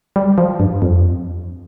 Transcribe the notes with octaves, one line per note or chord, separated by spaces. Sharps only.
G3
F3
G2
F2